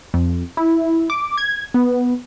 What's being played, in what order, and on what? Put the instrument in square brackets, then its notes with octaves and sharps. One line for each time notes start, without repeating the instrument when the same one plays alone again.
[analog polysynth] F2
E4
D6
G#6
B3